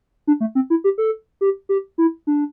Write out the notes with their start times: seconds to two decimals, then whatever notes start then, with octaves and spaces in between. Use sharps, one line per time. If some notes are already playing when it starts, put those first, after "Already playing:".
0.27 D4
0.40 A3
0.55 C4
0.70 E4
0.84 G4
0.98 A4
1.41 G4
1.69 G4
1.98 E4
2.27 D4